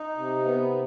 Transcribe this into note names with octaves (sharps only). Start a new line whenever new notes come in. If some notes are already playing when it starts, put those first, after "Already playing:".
Already playing: D#4
C3
B3